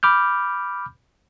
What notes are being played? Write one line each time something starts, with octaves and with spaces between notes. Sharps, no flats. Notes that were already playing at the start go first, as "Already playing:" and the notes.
B5 D6 F6 G6